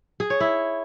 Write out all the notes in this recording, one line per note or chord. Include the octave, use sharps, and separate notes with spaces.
G#4
C#5
E4